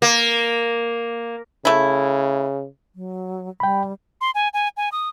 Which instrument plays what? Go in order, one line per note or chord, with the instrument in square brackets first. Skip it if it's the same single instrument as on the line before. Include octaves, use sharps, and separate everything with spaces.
[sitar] A#3
[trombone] C#3 [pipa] A3 E4
[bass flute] F#3
[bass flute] G3 [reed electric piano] G5 B5
[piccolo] C6
G#5
G#5
G#5
D#6